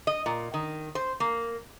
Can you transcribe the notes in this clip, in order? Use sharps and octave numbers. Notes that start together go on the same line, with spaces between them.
D#5
A#2
D#3
C5
A#3